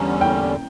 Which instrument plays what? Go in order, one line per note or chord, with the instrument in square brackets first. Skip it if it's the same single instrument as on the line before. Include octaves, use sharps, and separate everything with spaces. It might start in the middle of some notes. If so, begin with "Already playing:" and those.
Already playing: [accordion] E2 D3 G3 C#4 [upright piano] A#5
[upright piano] G5